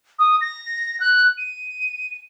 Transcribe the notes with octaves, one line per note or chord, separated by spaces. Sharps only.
D#6
A#6
F#6
D#7